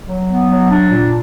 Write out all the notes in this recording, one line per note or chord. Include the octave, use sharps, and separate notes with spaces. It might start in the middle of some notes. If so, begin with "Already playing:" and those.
F#3
B3
F#3
D4
A#2